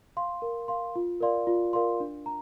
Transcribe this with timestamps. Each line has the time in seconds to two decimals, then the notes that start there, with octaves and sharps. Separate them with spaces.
0.17 F5 C6
0.42 A#4
0.68 F5 C6
0.96 F4
1.21 A#4 D5 F5 C6
1.47 F4
1.73 A#4 D5 F5 C6
2.00 D4
2.26 A#5